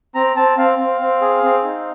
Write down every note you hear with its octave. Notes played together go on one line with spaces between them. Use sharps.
C4 A#5
C4 A5
C4 F5
C4
C4
G#4
C4
D#4